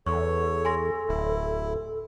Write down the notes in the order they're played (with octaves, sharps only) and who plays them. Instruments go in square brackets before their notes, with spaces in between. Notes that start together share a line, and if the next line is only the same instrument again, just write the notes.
[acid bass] E2 [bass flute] A4 [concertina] C#5 [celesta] C#6
[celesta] G#5 C6 A#6
[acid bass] D1 [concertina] E4